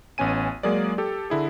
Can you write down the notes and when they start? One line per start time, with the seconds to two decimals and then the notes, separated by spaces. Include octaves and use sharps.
0.18 A1 B3 C#4 G#5 D#7
0.63 F#3 G#3 A#3 G#4 A#4 D5
0.98 G4 A4
1.30 D3 E4 G#4